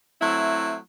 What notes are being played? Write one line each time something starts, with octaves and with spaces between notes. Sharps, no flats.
F#3 A3 C4 E4